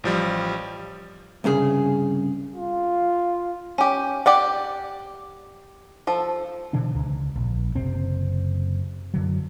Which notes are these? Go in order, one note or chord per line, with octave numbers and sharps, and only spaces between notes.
A1 F3 G3
C2 G2 C#3 G#4
F4
C#4 G4
G4 D5 F#5
F3 A4
B2 D3 E3 D4
C#2
A#1
F#1 C3 C4
F#2 D3 F#3